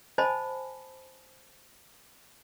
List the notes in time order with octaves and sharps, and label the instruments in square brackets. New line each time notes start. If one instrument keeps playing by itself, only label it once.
[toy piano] C5 D#5 G#5 A5 B5